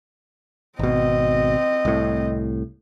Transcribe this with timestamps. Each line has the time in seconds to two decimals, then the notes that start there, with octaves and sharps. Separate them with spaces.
0.79 G#1 B2 C4 D#5
1.85 C2 A2